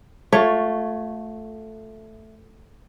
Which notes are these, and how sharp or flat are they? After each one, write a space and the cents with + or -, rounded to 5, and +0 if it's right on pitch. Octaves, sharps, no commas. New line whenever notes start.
A3 +0 F4 +25 C#5 +0